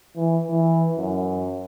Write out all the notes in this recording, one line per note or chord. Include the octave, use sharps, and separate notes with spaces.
E3
E3
F#2